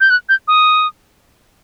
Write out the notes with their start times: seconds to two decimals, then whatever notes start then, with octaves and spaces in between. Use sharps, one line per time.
0.01 G6
0.10 F#6
0.29 G6
0.48 D#6